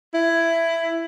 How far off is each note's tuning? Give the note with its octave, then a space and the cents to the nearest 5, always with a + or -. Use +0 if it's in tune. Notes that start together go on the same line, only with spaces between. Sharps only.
E4 +10